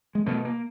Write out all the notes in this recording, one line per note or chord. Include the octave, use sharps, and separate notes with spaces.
G#3
B2 A3
A#3